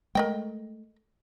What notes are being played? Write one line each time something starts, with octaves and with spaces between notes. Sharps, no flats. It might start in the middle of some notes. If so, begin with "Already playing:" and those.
G#3 A3 A#4 D#5 G5